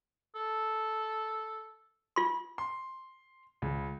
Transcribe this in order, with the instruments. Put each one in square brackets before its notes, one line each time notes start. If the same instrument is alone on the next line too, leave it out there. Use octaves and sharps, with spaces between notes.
[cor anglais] A4
[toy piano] F4 C6
[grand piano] C6
C#2